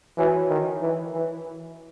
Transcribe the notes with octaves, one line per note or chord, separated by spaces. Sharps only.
E3 F#4 C#5 G#5
D#3
E3
E3